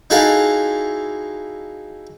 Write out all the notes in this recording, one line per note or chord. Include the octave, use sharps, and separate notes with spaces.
D#4 E4 F#4 G#4 A4 F5